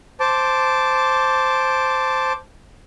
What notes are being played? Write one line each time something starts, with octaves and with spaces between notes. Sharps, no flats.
C5 A5 D6